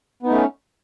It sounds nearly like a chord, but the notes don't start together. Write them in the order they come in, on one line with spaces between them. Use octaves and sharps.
B3 D#4 A3 C#4